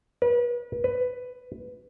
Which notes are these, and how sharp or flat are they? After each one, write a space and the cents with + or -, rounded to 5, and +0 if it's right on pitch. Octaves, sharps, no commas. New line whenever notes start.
B4 -40
B4 +10